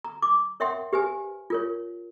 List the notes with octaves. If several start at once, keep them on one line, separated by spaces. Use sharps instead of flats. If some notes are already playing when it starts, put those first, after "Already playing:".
A#5
D6
A#4 C#5 E5 F#5 G5 C6
G4 B4 C5 G#5
F4 A#4 C#5